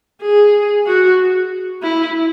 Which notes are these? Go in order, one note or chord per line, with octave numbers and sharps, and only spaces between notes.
G#4
F#4
E4